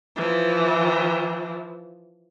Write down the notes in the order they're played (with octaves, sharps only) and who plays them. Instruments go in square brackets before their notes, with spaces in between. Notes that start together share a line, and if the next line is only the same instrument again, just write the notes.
[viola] E3 F3